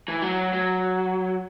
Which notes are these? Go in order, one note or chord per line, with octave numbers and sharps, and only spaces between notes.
E3
F#3
F#3